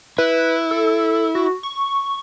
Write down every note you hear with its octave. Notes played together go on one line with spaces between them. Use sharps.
E4 B4
A4
F#4
C#6